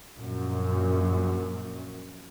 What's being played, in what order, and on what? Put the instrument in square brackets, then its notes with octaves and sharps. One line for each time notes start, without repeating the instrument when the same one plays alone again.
[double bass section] A#1 F#2 A#2